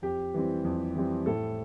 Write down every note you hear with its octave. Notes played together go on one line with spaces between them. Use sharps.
F2 G4
E3 G3 C4
F2
E3 G3 C4
A2 A4